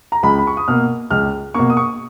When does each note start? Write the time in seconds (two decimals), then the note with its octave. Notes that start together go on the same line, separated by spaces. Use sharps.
0.12 A#5
0.23 C#2 B5
0.38 B5
0.47 C#6
0.57 D#6
0.68 B2 A#3 F6
1.11 C#2 F6
1.54 B2 A#3 C#6
1.70 D#6
1.77 C#6